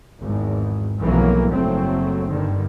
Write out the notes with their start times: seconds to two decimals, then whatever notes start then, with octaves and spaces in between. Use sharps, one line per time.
0.21 G#1 E2 G#2
1.00 B1 F2 G#2 E3 F#3 A#3
1.53 F#1 F#3 A3 C4
2.29 G2 D3 D#3